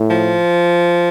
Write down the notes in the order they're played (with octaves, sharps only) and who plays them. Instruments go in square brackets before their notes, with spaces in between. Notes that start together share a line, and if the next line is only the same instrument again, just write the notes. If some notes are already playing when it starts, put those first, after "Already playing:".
Already playing: [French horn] A2
[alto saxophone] F3